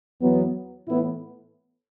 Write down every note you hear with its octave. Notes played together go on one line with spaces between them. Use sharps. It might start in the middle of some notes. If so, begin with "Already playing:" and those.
E2 E3 F#3 B3
A2 E3 B3 E4